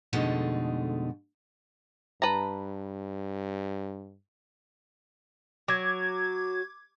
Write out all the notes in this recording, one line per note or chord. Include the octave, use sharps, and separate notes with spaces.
F2 B2 D3 G#3 A3 D#4
G2 B4 A5 A#5
F#3 D6 G#6